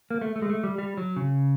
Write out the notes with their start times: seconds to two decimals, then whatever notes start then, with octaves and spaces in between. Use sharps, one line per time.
0.11 A#3
0.21 A3
0.36 A3
0.42 G#3
0.49 A3
0.63 G3
0.78 G3
0.97 F#3
1.16 C#3